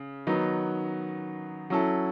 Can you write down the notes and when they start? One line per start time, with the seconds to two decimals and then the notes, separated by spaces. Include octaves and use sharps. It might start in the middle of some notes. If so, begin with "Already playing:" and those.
Already playing: C#3
0.27 D#3 F#3 B3 D#4
1.70 F#3 C#4 E4 A4